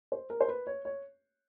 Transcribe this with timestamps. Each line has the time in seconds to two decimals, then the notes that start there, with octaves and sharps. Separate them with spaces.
0.12 C5
0.30 A#4
0.41 C5
0.48 B4
0.67 C#5
0.85 C#5